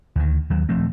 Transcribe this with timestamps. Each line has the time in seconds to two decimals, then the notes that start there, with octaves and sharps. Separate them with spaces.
0.16 D2 D#3
0.50 D#2 F#3
0.69 D#1 F3 A3 C4